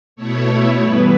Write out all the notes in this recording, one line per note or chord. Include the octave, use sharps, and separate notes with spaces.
B2 A3 E4 C#5
G2 E3 B3 E4 B4